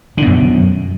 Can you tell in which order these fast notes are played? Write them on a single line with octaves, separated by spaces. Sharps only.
D3 B2 F#2